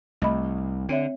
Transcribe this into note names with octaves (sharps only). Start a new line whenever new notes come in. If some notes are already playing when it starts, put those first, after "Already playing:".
C2 A3 D#5 B5
D3 C4 C#5 E5